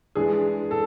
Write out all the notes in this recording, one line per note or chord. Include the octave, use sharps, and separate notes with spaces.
E3 G#3 D4 G#4
A4